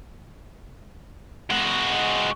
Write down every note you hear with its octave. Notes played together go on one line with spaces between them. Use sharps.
G#3 F#4